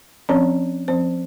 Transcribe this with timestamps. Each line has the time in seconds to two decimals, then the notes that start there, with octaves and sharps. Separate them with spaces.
0.29 F3 C4 C#4 C#5
0.88 F3 C4 C5